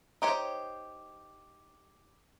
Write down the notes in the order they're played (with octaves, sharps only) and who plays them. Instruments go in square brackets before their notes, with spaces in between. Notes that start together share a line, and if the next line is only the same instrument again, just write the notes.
[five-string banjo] D#4 G4 C5 C#5